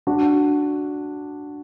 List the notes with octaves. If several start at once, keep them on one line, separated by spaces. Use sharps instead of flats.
D4 F#4